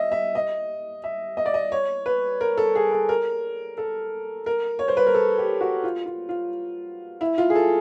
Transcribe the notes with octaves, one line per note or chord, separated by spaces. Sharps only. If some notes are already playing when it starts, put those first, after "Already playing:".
Already playing: D#5 E5
E5
D#5
E5
D#5
D5
D#5
C#5
B4
A#4
A4
G#4
A4
A#4
A4
A#4
C#5
C5
B4
A#4
A4
G4
F#4
F4
F4
F4
E4
F4
G#4
A4